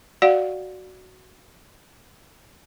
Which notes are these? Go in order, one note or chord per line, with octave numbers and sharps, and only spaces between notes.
F#4 D5 F5 F#5